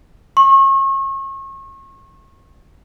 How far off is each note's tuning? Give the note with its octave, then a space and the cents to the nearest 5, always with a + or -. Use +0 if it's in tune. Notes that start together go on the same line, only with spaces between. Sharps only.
C#6 -35